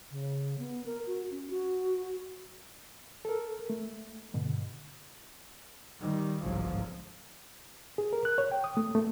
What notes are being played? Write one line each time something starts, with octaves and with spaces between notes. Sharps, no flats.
C#3
B3
A#4
F#4
C#4
F#4
A4 A#4
A3
G2 B2 D3
D#3 G3
G1 C2 G#2 F3 F#3
G#4
A#4
F#6
C#5
G5
D#6
A3
A3